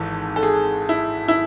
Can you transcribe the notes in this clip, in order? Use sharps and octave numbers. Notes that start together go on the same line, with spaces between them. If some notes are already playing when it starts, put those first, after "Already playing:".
Already playing: G#1 G#2 E3 A4
A4
G#4
E4
E4